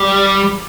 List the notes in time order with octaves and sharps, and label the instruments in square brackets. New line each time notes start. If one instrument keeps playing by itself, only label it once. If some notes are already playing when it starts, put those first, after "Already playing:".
Already playing: [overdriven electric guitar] G3